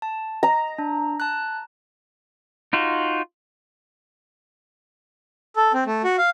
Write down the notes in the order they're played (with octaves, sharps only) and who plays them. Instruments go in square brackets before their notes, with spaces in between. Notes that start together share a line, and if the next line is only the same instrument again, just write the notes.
[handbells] A5
[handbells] D#5 [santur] A#5
[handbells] D4
A5 F#6
[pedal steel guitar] D#4 F4 F#4
[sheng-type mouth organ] A4
C4
A3
F#4
F5